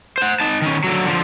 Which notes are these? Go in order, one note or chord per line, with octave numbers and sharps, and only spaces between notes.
C5 F#5
D#4 A5
D#3 C#4
D3 F#3
D3 F3